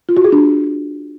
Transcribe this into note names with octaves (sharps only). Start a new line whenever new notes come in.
F4
F#4
G#4
D4